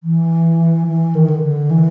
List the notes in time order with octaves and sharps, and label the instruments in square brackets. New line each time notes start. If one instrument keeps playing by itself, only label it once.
[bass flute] E3
E3
D#3
D3
D3
E3